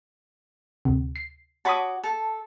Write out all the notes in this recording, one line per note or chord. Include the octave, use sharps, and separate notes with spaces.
D2 C3
C7
F#4 C#5 A5 B5 D6 D#6
A4